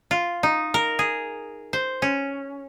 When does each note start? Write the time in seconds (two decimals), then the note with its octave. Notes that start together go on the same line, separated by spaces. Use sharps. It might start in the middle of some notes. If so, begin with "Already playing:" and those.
0.11 F4
0.43 D#4
0.74 A#4
0.99 G#4
1.73 C5
2.02 C#4